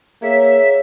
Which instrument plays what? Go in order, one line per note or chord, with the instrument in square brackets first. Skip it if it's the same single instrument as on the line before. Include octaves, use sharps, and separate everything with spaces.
[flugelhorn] A#3 [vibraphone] G#4 C#5 [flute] E5